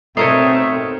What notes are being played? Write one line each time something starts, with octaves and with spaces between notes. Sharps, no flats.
B2 A3 C4 D#4 A#4 C#5 D#6 C7